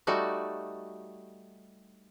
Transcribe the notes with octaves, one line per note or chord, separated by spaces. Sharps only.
G3 A3 D#4 F#4